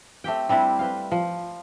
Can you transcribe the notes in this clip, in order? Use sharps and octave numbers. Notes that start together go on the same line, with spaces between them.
A3 C4 G4 G5
G3 C4 D4 E4
B4 C5 F5
F3